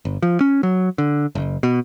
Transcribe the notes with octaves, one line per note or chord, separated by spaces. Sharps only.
G1
F3
C#4
F#3
D3
F#1
B2